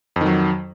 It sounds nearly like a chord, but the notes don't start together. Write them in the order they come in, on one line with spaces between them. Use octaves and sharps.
F2 D#3 F#3